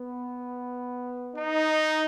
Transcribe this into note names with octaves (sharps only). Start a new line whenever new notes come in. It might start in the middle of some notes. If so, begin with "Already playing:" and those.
Already playing: B3
D#4